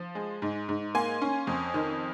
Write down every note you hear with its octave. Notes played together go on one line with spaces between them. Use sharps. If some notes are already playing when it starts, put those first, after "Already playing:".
Already playing: F3
G#3
G#2
G#2
A#3 G#5 C6
C#4
F2
D#3